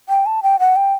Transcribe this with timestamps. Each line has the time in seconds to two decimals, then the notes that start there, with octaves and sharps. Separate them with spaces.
0.09 G5
0.26 A5
0.43 G5
0.59 F#5
0.76 G5